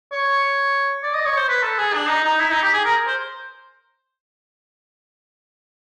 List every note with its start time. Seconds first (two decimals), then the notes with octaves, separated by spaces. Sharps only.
0.12 C#5
1.03 D5
1.14 D#5
1.26 C#5
1.37 C5
1.49 B4
1.63 A4
1.78 G#4
1.94 D4
2.09 D#4
2.24 D#4
2.39 E4
2.51 D#4
2.62 G4
2.74 G#4
2.85 A#4
3.07 C5